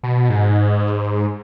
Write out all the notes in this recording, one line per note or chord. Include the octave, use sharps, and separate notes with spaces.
B2
G#2
G#2